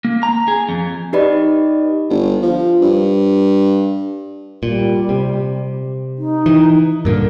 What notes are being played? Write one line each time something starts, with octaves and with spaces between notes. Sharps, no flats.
A#3
A#5
G#4
F2
D#4 G4 B4 D5 D#5 B5
G1
F3
G2
A#2 G3
C3
D#4
E3
G2 A#2 D3 A#4